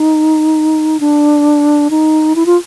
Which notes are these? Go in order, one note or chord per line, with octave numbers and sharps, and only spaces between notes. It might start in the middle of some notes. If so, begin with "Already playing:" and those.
Already playing: D#4
D4
D#4
E4
F4